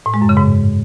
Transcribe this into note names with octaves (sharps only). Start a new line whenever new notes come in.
A2
G#3
F#2
C#3
G#2